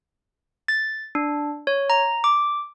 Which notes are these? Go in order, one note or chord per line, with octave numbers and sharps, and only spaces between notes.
A6
D4
C#5
A#5
D6